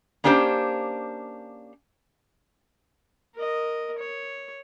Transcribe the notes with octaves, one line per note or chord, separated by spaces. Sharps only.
A#3 C#4 D4 G4 A4 C5
A#4 D#5
C#5